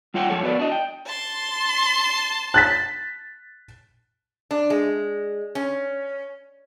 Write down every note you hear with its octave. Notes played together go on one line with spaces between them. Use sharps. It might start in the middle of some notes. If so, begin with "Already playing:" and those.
G3 F4 C#5 F#5 G5
F2 F3 A4 C#5
B3 F#4 B4 D5
D4 D#5
G5
A5 C6
F#6 A6 B6
D4
G#3
C#4